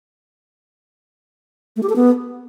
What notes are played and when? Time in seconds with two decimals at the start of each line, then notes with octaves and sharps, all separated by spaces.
1.76 A3
1.83 G4
1.89 A4
1.96 B3